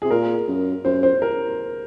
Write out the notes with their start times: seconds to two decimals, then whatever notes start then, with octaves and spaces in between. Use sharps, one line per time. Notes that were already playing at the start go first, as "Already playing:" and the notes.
0.02 C3 G#4
0.11 A#2 A#4
0.48 F#2
0.84 F#2 C5
1.03 C5
1.22 A#4